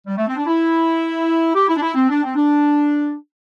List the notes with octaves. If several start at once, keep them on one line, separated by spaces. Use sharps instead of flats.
G3
A3
C4
D4
E4
G4
E4
D4
E4
C4
D4
C4
D4